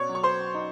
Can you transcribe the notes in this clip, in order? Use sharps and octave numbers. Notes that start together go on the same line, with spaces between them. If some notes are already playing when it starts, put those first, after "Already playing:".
Already playing: B2 C#5 D5 C#6
F#3
C#6
C5 C6
D#4